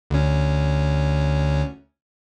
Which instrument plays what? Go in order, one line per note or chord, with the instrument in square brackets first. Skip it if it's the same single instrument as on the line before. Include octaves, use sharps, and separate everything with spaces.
[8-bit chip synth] D2 C#4